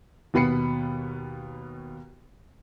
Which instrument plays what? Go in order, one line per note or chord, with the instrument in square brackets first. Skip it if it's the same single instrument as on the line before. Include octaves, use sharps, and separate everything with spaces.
[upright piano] D#2 B2 B3 B5 C7 C#7